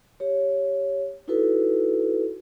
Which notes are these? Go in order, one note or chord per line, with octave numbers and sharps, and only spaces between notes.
G4 C#5
D#4 E4 F#4 A4 B4